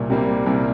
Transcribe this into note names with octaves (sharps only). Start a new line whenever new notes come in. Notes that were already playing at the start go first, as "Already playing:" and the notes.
Already playing: C2 A#2
C3 G3 A#3
C2 C3